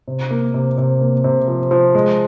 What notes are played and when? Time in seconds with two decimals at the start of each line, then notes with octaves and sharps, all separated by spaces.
0.08 C3
0.31 A#3
0.54 C3
0.78 C3
1.01 A#3
1.24 C3
1.48 F3
1.71 F3
1.95 G#3